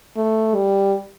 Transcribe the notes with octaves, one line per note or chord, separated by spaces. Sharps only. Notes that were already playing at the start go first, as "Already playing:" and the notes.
A3
G3